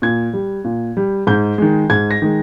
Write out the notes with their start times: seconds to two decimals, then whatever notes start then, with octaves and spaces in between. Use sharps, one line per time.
0.02 A#2 G#6
0.33 G3
0.64 A#2
0.97 G3
1.27 G#2 G6
1.58 D#3 G#3
1.90 G#2 G#6
2.11 A#6
2.22 D#3 G#3